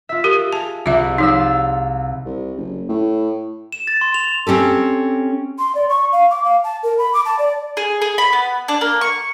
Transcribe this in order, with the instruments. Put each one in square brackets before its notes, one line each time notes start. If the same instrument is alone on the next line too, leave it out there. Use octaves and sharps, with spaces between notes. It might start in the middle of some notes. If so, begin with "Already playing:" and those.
[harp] F4 E5
[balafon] G4 A#4
[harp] G#4 [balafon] A5
[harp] C2 [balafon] F4 E5
[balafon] F3 D#4 [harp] F5 E6
[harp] A6
[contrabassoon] C2
F#1
A2
[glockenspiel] E7
A6
C6
F7
[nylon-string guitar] C4 C#4 G4 A4
[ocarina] C6
D5
C#6
F5
D6
F5
A5
A#4
B5
D6
A5
D5
[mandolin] G#4
G#4
B5
B3
D4
A#3
C#6